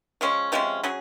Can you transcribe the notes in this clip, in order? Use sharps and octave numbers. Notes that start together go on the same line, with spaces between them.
F3 G#3 C#4
C3 F3 G#3 C#4
F#3 C#4 G#4